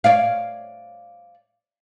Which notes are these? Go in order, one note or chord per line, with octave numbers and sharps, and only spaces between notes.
C#5 D5 F5